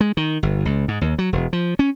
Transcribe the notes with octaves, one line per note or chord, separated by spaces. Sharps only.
G#3
D#3
G1
C#2
G#2
D#2
F#3
E1
F3
C#4